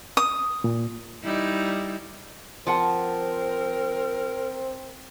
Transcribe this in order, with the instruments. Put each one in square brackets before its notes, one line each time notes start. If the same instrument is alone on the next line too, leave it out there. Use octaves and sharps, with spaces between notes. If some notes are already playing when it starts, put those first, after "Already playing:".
[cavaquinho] D#6
[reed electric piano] A#2
[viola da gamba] G3 D#4 E4
[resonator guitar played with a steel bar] F3 F#5 A5 [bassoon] C4 [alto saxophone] A#4